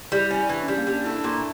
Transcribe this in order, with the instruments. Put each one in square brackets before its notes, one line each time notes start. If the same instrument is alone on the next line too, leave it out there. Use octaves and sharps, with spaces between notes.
[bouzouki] G3 [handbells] E4
[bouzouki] C#4 [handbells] E4
[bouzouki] E3 [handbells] D4
[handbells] C#4
[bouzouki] G3
[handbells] A#3
[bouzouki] G3
[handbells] D4
[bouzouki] A3 [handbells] E4
[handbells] D4
[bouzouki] A#2